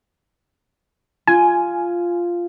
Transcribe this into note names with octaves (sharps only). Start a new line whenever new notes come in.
F4 G#5